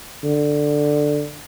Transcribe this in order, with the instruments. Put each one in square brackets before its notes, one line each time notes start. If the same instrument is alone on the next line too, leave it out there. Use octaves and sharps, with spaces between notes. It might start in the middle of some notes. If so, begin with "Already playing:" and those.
[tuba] D3